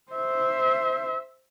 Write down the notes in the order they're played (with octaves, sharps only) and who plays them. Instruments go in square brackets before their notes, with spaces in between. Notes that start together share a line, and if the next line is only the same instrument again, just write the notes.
[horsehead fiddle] C5 E5